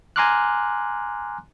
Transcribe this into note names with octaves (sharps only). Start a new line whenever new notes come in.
G#5 A#5 C6 D6 F6 F#6